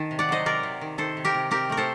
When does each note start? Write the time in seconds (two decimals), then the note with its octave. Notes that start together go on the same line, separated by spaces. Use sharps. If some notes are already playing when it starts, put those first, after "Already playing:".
Already playing: D#3 A5
0.11 C3
0.19 D5 F#5
0.29 F#3 C5 D#5
0.46 C3 A#4 D5
0.63 C3
0.81 D#3
0.98 D#3 A4 C5
1.17 C3
1.25 G4 A#4
1.34 C3
1.51 C4 G4 A#4
1.70 A3 A#4
1.77 A4 C5